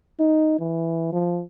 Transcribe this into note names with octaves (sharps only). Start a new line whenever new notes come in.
D#4
E3
F3